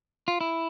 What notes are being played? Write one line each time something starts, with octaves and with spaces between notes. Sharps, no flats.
F4
E4